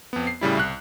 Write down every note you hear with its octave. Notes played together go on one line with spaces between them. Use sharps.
F2 B3
C7
A2 C#3 G3 E4
C2 F#6